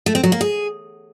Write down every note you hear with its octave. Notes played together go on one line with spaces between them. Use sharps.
A3
C4
F#3
A#3
G#4